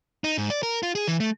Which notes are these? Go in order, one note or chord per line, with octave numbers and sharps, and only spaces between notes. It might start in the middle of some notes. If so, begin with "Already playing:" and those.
D#4
G#2
D5
A#4
F4
G#4
E3
A3